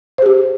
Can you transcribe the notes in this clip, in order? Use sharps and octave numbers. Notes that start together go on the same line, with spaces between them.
G4 G#4 C5